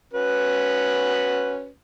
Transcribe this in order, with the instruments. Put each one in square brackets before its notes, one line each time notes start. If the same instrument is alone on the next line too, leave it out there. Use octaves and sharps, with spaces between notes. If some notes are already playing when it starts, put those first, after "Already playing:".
[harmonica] C#4 F#4 B4